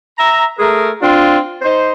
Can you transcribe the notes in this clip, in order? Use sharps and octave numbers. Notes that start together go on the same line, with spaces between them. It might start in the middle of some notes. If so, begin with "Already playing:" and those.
E5 A#5
A3 G#4 A#4
C4 D4 F4
D#4 C5